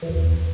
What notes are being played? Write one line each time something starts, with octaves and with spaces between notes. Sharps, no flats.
E3
F#2
E2